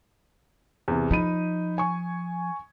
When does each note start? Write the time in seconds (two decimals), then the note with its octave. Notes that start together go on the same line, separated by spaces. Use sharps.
0.88 E2 C3
1.11 F3 D#4 B5 D#7
1.78 G#5 C#6